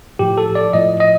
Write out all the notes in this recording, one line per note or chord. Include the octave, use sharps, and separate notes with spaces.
A2 F3 G4
A4
D5
A2 F3 D#5
D#5